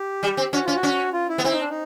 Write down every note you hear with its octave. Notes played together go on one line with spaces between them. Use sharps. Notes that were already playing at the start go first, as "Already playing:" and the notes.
Already playing: G4
G3
C4
C#4 F#4
C#4 F4
F#4
C#4
F4
E4
B3
C4 E4
D#4
D4
D#4